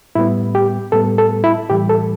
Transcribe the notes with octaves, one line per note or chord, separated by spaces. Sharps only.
A2 G3 B3 E4
G4
A2 G3 B3 A4
A4
E4
A2 E3 G3 G4
A4